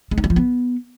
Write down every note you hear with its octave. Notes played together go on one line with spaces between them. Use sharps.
G#3
D#4
G3
F3
B3